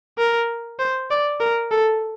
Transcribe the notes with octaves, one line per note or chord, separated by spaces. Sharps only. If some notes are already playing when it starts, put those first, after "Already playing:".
A#4
C5
D5
A#4
A4